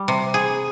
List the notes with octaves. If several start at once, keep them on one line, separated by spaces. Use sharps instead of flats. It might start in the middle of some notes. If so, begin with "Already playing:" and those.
Already playing: G3
C3
G#4